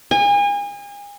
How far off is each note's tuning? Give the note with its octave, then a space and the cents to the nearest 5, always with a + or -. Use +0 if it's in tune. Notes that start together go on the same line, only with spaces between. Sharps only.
G#5 -35